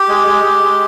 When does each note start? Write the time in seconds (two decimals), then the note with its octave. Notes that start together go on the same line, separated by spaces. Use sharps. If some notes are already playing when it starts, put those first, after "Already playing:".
Already playing: G4
0.09 G#3
0.27 G#3
0.44 G#3
0.63 G#3